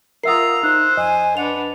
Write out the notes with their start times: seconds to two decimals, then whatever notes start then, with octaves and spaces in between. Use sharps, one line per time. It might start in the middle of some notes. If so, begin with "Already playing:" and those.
0.24 F4 A#4 E5 F#5 A#5 D#6 E6 C7
0.63 D#4 C5 F#6
0.97 F2 D#5 G#5
1.37 D4 B4 F#5 F7